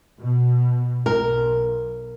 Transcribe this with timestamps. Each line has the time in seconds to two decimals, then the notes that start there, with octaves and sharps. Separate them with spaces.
0.19 B2
1.06 B1 A#4